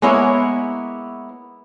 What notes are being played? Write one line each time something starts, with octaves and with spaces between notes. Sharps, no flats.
G#3 A#3 B3 E4 C#5